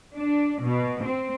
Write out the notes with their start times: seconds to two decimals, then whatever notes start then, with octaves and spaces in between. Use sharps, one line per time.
0.15 D4
0.63 B2
1.05 C4